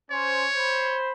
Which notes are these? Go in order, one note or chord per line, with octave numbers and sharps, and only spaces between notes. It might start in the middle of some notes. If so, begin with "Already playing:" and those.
C#4 C5 C#5
C5 B5